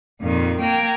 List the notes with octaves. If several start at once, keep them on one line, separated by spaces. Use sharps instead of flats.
F2 A#2 D#3
A#3 G5 A#5 G#6